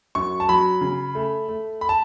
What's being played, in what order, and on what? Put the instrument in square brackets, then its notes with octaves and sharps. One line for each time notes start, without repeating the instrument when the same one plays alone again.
[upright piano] F#2 C#6
A5
F#3 B5
C#3
A3
A3
B5
A5